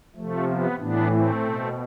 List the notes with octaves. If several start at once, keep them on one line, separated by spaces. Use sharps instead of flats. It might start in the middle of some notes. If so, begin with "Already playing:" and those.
C3 F3 A3
B3
A2 E3 B3 D4
A3 C4
B2